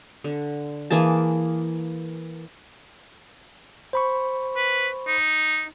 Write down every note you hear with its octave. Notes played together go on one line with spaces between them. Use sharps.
D3
E3 A#3 G#4 A5
C5 B5 C#6
B4
D#4